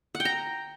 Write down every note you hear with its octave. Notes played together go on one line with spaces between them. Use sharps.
F#5
G5
A#5